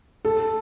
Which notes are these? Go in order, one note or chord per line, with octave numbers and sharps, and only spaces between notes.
A4